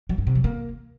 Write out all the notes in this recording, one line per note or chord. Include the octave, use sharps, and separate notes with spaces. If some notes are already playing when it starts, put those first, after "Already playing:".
F#3
G2
C3
F#3
A#3